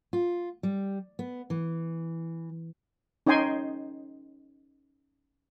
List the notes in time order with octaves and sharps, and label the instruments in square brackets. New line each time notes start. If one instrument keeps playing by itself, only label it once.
[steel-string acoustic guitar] F4
G3
B3
E3
[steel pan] C#4 D#4 D#5 G5 G#5 C6